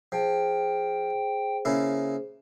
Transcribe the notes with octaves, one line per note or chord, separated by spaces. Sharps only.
F3 G#4 C5 G5
C#3 A#3 E4